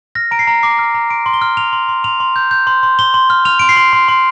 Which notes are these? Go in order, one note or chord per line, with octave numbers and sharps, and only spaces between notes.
F6 A#6
A#5 D7
C7
A#5
D6 C7
F6
A#5
C6 D7
C6
G7
F6
F6 F7
C6
C6
C6 F7
C6
G6
G6
C6
C6
C6 G7
C6
F6
F6 F7
C6 D7
C7
C6
C6
C6